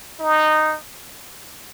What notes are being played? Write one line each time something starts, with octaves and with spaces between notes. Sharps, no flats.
D#4